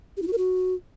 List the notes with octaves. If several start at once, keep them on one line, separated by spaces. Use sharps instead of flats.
G4
E4
F#4
A#4
F#4